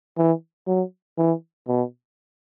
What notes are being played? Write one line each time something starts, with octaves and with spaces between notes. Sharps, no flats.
E3
F#3
E3
B2